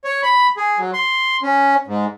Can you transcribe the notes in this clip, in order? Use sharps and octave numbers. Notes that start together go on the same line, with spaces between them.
C#5
B5
G#4
F#3
C6
C#4
G#2